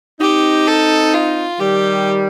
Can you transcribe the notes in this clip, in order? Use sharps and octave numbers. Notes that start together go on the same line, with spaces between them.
C4 D#4 G4
A4
F4
D#3 G3 G4